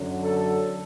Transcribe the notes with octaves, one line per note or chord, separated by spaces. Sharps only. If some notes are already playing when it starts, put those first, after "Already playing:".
Already playing: F#2 D3 F#3
A4